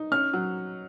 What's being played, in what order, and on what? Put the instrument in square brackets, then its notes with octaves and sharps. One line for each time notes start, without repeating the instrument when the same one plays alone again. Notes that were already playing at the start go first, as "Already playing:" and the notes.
Already playing: [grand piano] D#4
[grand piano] C#4 [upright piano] F6
[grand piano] F#3